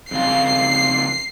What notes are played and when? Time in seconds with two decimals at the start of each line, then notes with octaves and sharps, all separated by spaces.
0.11 F2 C#3 F4 C7